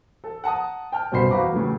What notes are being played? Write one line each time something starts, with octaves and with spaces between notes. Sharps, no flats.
A4
F#5 A5 A#5 D#6
G5 A5 F6
C2 F#2 B2 C5 B5 C7
E2 F#4 F5 A#5 B5 D6
A2 C#3 E3 F#3 A3